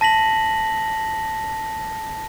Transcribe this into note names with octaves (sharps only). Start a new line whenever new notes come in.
A5 A#6 B6 F#7